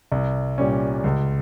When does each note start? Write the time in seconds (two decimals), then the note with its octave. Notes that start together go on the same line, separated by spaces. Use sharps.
0.12 C2
0.58 A#2 G3 C#4
1.04 C#2